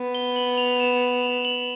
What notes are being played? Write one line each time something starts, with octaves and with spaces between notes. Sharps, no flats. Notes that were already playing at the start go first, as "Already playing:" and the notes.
Already playing: B3
G7
F#7
F7
E7
F7
F7
F#7